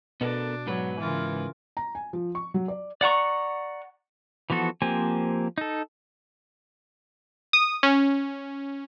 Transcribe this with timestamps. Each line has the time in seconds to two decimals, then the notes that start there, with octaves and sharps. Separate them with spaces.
0.21 B2 B3 D4 A4 A#4
0.67 G#2 F#3 B4
1.00 C#3 E3 F4 A#4
1.77 A#5
1.95 G#5
2.13 F3
2.35 C#6
2.54 F#3
2.68 D5
3.01 D5 F#5 A#5 C#6
4.50 E3 F3 B3 F#4 A4
4.82 F3 A#3 C4 G4 G#5
5.58 D#4 A4
7.53 D#6
7.83 C#4